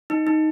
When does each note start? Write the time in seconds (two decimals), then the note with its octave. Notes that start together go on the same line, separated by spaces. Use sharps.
0.10 D#4
0.27 D#4